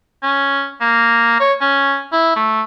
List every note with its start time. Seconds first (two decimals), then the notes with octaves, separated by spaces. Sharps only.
0.23 C#4
0.81 A#3
1.40 C#5
1.61 C#4
2.12 E4
2.36 A3